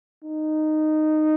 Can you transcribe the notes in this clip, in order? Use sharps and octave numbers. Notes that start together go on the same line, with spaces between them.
D#4